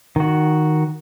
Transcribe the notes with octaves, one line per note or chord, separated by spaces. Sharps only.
D#3 F#4